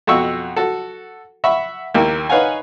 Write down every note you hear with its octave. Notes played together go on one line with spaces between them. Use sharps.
F2 B2 F#4 F#5 C#6 E6
F#4 A4
E5 F#5 B5 C#6
D#2 A#3 E4
D#4 B4 C#5 F5 F#5 G#5